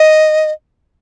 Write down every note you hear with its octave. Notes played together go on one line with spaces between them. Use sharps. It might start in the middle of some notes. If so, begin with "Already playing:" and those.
Already playing: D#5